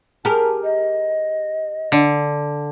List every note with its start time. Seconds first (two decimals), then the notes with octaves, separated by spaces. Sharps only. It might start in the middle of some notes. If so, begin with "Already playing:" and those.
0.25 G4 G#4 A#4 A5
0.63 D#5
1.92 D3